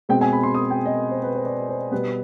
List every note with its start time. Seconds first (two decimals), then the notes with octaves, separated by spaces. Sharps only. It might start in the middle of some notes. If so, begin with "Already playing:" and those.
0.09 B2 G#3 C4 G5
0.21 G#5
0.33 B5
0.43 C6
0.55 D#6
0.70 G5
0.86 D#5
1.11 C5
1.23 B4
1.35 C5
1.46 D5
1.69 C5
1.91 B2 G3 B3 B4